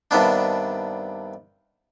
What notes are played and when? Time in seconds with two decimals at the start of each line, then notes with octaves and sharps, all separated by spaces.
0.11 G2 C3 D#3 B3 D4